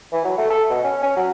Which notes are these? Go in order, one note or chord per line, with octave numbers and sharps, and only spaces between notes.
E3
F#3
A3
A4
B2
C#4
C#4
F#3